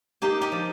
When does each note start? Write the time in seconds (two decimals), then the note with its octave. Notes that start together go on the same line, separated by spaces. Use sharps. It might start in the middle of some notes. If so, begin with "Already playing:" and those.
0.22 A#3 D#4 G4
0.41 D#4 G4
0.52 F3